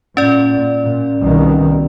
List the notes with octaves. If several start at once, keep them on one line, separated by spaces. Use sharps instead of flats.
A#2 C#4 D5
A#2
C2 B2 D#3